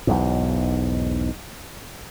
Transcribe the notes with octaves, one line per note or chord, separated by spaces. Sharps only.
B1 E2 G#2